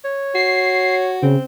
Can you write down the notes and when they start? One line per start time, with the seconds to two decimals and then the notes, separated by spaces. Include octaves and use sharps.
0.04 C#5
0.35 F#4 C7
1.22 C#3 C4